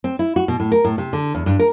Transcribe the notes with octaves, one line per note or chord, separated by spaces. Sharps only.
C4
E4
F#4
B2
A2
A#4
A2
C3
D3
E2
G2
A#4